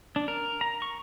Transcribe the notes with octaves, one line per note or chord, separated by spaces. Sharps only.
D4
A#4
A#5
C#6